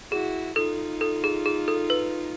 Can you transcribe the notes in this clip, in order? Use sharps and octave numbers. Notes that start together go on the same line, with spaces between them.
E4 F#4 G#4
D#4 F4 A4
A4
G#4
G#4
A4
B4